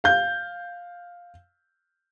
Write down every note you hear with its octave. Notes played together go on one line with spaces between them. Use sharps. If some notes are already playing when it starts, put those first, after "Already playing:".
F5 G6